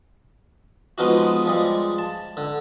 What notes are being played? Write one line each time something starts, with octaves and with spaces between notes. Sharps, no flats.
F3 G#3 B3 D#4 F4 F#4
F3 G3 G#3
A5
D3